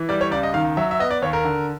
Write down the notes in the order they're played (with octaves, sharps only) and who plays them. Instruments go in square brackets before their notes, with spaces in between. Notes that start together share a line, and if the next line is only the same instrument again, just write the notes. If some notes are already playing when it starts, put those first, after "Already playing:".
Already playing: [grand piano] E3
G3 D5
C#5
C#2 D5
D#5
D#3 F5
F#3 E5
E5
B3 D#5
D5
D#2 C#5
A#4
D3